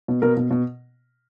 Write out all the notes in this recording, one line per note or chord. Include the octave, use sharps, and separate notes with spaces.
B2
B2 A#4
B2
B2